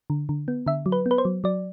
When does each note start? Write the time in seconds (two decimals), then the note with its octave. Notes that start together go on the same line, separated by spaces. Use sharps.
0.10 D3
0.29 D3
0.48 B3
0.66 D3 E5
0.86 F#3
0.92 B4
1.06 B3
1.11 B4
1.18 C5
1.25 F#3
1.44 F#3 D5